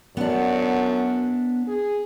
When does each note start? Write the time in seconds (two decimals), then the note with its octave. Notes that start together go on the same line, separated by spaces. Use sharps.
0.17 F#2 B3 D4
1.68 G#4